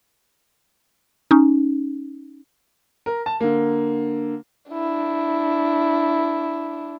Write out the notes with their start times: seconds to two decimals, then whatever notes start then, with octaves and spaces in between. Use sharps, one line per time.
1.31 C#4 D#4
3.06 A#4
3.26 A5
3.40 D3 A#3
4.71 D4 E4